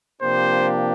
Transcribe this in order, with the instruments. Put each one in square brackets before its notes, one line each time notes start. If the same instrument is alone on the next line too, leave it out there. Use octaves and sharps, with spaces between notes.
[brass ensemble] C3 F3 A#3 D4 G4 [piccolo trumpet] C5